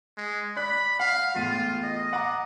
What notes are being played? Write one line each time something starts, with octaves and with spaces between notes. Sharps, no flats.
G#3
D5 B5 F#6
F5 F#5
E2 A2 F4 D#7
D#5
F#5 A#5 D6